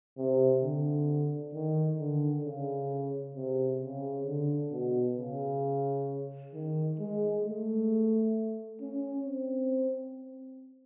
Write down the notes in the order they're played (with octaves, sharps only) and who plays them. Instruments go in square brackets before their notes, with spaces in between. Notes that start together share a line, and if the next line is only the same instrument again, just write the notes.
[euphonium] C3
D3
D#3
D3
C#3
C3
C#3
D3
B2
C#3
D#3
G#3
A3
C#4
C4